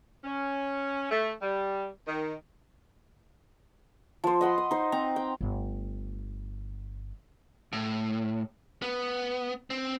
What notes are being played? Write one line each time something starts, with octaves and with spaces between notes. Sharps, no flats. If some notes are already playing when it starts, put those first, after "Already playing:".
C#4
A3
G3
D#3
F3 C5
D#5 F#5 B5 C6
D#6
D#4 C5
C4 A#5
G5
G1 A3
A2
B3
C4